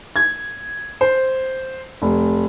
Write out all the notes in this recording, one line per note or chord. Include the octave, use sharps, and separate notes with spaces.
G#6
C5
F1